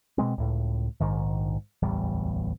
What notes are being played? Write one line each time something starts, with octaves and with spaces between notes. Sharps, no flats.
B2 E3 G#3 C4
C#2 A2
A#1 G#2 D#3
D1 A1 E2 G3